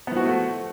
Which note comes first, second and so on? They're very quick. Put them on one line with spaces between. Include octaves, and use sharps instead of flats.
B3 F3 F#4 E4 A3